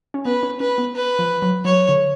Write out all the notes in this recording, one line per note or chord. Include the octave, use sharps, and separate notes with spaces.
C#4
B3 B4
C#4
C#4 B4
B3
B4
F3
F#3
F#3 C#5
D3